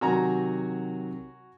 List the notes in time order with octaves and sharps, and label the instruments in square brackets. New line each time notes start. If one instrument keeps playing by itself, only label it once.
[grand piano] C3 D#3 F#3 [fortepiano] F#4 G#5 A#5